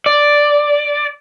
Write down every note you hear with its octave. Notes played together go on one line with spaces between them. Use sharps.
D5